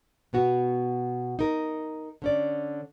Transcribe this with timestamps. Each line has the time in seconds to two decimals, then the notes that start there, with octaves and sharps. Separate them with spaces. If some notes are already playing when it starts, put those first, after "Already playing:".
0.33 B2 B3 F#4
1.39 D#4 A#4
2.22 D3 C#4 D5